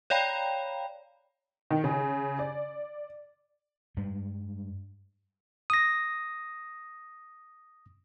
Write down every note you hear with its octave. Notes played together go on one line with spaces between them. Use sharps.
C#5 D5 F5 G5 A#5 B5
D#3
C#3
D5
G2 G3 G#3
D#6 A#6